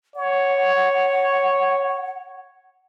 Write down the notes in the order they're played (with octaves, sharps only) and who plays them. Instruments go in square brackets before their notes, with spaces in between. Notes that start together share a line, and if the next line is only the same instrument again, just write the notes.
[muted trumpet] C#5 [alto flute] F#5